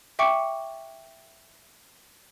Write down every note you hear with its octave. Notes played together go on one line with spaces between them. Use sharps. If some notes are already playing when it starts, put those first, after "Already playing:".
E5 G5 C#6 D6 C#7